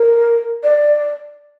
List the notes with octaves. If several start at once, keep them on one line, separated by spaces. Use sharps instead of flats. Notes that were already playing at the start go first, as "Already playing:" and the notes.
Already playing: A#4
D5